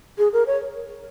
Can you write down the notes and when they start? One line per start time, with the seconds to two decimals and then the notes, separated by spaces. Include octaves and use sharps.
0.18 G#4
0.33 A#4
0.47 C#5